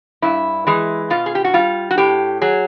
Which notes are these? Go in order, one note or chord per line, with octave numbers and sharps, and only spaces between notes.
G2 E4
E3 G#3
B2 F4
G#4
G4
F#4
G3 F4
F#4
A2 G4
F#3 G#4